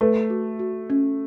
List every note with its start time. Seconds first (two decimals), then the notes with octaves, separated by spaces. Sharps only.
0.01 A3 B4
0.30 F#4
0.59 F#4
0.90 C#4